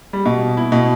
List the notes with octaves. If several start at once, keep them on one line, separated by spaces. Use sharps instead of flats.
G3
B2
E4
B2